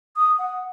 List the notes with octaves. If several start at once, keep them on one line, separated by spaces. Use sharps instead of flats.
D#6
F#5